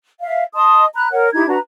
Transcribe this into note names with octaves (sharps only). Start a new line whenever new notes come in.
E5 F5
D#5 A5 C6 D#6
A#5 B5 F#6
A#4 C#5 F#5
D#4 E4 G4 G#6
D4 F#4 B4 A#5